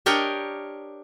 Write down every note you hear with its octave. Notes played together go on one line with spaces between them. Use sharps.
D4 G4 A#4 C#5 D#5 G5